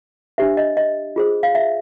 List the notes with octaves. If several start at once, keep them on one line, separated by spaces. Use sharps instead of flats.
D4 G4 C5 E5
D#5
D#5
F4 G#4 C5
F5
E5